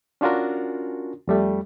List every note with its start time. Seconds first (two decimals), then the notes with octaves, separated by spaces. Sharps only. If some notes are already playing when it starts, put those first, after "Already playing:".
0.21 C#4 D4 F4 F#4 A#4
1.28 F2 G3 A3